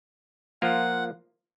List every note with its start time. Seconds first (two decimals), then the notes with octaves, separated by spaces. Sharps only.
0.62 F3 A#3 F4 A#4 F#5